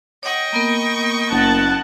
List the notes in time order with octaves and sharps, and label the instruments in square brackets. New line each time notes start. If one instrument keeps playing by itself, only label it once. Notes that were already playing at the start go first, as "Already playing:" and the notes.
[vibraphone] C#5 F#5 [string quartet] D#5 G5 C#6
[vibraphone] A#3 B3 A#4
[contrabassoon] F#1 [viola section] F#5 A5